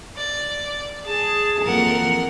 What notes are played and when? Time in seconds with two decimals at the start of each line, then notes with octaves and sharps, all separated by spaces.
0.16 D5
1.07 G#4 A5
1.63 F2 E3 A#3 A#4 F#5